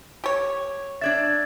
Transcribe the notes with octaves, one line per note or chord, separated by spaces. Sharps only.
G4 C#5
D4 D5 E5 G#6 A6